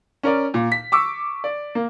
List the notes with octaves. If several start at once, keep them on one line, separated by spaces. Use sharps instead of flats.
C#4 A#4 D5
A#2
B6
C#6 D6 E6
D5
A#3